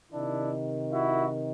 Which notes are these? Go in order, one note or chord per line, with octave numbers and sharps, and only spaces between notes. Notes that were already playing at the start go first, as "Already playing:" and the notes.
C3 D#3 D4 E4
E4 F#4